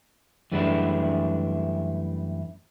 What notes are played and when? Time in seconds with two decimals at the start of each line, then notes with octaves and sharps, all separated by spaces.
0.52 F#2 E3 G3 A3 D4 E4